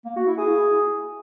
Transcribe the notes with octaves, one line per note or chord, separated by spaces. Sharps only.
A#3
F#4
E4
G#4